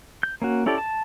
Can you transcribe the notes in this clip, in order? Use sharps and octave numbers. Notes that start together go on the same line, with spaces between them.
G6
A#3 C#4 F#4
C#4 E4 G4 A4 D5
A5